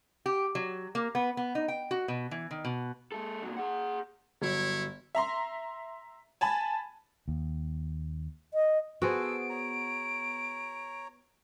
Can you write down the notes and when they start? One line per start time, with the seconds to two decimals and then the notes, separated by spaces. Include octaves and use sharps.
0.26 G4
0.55 F#3
0.95 A#3
1.15 B3
1.37 B3
1.55 D#4
1.68 G5
1.91 F#4
2.08 B2
2.31 E3
2.51 D#3
2.65 B2
3.12 G#3 A4
3.43 A#2 F#3
3.57 G#4 F#5
4.42 G1 F#3 E4 C#5
5.15 E5 A#5 C6
6.41 G#5 A5 B5
7.28 D#2
8.54 D#5
9.02 B3 F#4 G#4 A4 C5 E6 D7
9.49 C#5 A#5